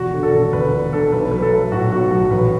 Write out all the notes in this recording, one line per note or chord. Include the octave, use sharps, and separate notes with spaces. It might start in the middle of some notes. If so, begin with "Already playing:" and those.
Already playing: E1 F#4
D3
A4
E1
D2 B4
E1
D3 A4
B1 B4
F#3 B4
A4
A3
A2 F#4
B1 F#4
F#3 F#4
A1 B4